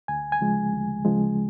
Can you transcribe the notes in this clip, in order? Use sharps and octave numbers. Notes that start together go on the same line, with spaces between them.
D2 G#5
G#5
C#3 F3 G#3
D2
C#3 F3 G#3